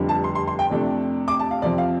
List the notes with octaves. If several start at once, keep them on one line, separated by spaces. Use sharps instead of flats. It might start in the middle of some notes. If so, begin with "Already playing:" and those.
Already playing: F1 F2 D3 G3
A5
C6
C6
C6
G5
F2 C3 A3 D4
D6
A5
F5
F2 C3 F3 C4 D5
F5